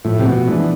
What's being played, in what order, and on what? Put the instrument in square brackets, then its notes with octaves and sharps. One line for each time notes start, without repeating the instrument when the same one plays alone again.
[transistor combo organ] A2 [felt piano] F3
[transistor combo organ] C3
B2
[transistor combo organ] E3 [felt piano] G#3 B3 D4